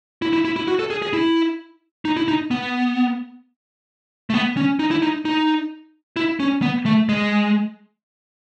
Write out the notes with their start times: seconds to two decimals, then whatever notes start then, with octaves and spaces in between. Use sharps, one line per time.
0.22 E4
0.33 E4
0.45 E4
0.56 E4
0.68 F#4
0.79 A4
0.90 G#4
1.02 G#4
1.13 E4
2.05 D#4
2.17 E4
2.28 D#4
2.51 B3
4.30 A3
4.34 B3
4.57 C#4
4.79 D#4
4.91 E4
5.02 D#4
5.25 D#4
6.16 E4
6.40 C#4
6.62 B3
6.86 A3
7.09 G#3